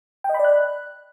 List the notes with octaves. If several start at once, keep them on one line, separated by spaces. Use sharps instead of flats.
G5
D#5
B5
D5
F#6